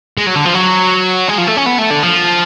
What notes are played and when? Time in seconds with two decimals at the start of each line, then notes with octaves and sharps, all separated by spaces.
0.18 G#3
0.27 F#3
0.36 D3
0.46 F3
0.55 F#3
1.29 G#3
1.38 F3
1.47 A3
1.57 C#4
1.66 B3
1.78 A3
1.90 D3
2.03 F3